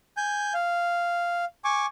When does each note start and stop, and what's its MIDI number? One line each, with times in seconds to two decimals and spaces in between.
0.17 0.53 80
0.17 0.53 91
0.54 1.45 77
1.64 1.86 80
1.64 1.86 85
1.64 1.86 86